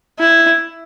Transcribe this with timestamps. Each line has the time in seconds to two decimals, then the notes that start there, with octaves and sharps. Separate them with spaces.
0.19 E4